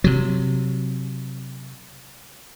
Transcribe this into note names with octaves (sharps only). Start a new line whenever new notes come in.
C3 F#3